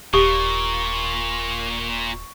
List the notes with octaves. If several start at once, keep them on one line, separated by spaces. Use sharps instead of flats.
D#1 A#2 G4 C#6